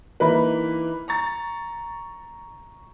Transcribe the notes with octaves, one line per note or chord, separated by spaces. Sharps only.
E3 A#3 D#4 E4 A#4 B4
A#5 C#6 A6